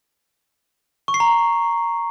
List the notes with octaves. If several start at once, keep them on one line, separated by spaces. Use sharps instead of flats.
C#6
C7
A#5